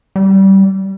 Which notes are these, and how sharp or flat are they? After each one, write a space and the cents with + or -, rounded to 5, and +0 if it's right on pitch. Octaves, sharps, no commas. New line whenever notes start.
G3 -20